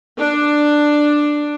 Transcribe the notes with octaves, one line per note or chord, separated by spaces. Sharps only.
D4